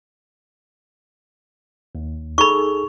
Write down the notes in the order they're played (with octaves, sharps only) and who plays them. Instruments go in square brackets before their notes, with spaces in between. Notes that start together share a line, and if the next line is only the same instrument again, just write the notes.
[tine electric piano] D#2
[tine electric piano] D#4 G#4 A4 [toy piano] B5 C#6